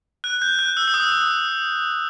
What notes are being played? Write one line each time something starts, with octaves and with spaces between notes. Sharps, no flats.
F#6
G6
F#6
E6
E6
D#6
D#6